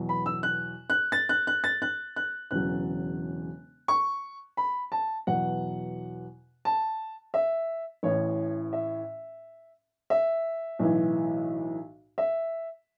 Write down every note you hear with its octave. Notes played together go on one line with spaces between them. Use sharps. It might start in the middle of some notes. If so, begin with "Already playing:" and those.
Already playing: E2 B2 F#3
B5
E6
F#6
F#6
A6
F#6
F#6
A6
F#6
F#6
E1 E2 C#3 F#3 F#6
C#6
B5
A5
E2 B2 F#3 F#5
A5
E5
A1 A2 E3 C#5
E5
E5
B1 A2 E3
E5